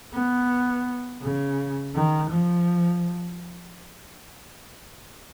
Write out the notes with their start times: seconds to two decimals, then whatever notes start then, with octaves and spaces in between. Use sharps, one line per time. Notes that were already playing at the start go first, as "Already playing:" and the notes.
0.14 B3
1.22 C#3
1.95 D#3
2.30 F3